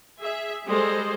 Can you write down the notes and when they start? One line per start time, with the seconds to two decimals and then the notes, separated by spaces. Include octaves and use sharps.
0.20 G#4 E5
0.67 G3 G#3 A4 C5 D#5